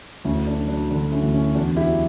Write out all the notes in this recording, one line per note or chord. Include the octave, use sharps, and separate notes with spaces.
D2 C#4 E4
D4
F#3
D4
D3 D4
C#4 E4
D2
C#4 E4
E2 D4 F#4
E4 G4
F#3